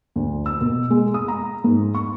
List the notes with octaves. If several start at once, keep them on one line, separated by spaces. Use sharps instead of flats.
D2
E6
B2
G#3
D#6
A#5
G#2
C#6